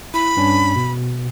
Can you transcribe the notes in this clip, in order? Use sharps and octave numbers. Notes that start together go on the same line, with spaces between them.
E4 B5
G2 C#4 D4
B2